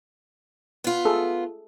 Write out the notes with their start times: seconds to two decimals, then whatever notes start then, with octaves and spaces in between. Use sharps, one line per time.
0.84 B3 F4
1.05 G#4 A4